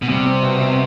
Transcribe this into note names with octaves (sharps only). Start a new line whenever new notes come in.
B2
C3 G3
C4
B2
B2